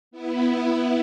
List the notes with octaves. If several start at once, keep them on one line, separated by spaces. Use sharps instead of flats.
B3 E4